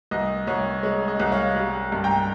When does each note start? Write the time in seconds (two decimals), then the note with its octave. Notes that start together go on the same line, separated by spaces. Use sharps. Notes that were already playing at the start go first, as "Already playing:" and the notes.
0.11 C2 D#5
0.47 C2 C#5
0.83 G#3 C#5
1.08 D#5
1.20 C2
1.32 C#5 F5
1.56 G3
1.92 G2
2.04 G5 A#5